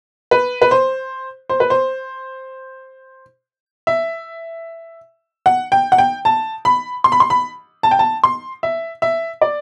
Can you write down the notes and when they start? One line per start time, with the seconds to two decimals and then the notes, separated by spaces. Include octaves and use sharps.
0.31 B4
0.62 B4
0.71 C5
1.50 C5
1.60 B4
1.70 C5
3.87 E5
5.46 F#5
5.72 G5
5.92 F#5
5.98 G5
6.25 A5
6.65 B5
7.04 C6
7.12 B5
7.20 C6
7.30 B5
7.83 A5
7.91 G5
7.99 A5
8.24 C6
8.63 E5
9.02 E5
9.42 D5